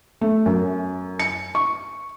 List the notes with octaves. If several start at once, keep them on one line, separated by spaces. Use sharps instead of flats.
A3
F#2
C#7
C#6